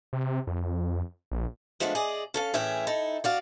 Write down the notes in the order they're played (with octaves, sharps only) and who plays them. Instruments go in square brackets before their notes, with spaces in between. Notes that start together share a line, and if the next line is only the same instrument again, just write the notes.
[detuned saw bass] C3
F2
A#1
[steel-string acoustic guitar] F3 G#3 A3 B3 D4
G#4 D5 D#5
C#4 A4 F5
A2 E3 C#4 G#4 E5 G5
D#4 E4 A4
F#4 D5 F5